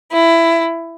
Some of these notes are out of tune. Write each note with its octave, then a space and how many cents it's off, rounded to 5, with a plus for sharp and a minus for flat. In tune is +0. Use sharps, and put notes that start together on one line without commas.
E4 +15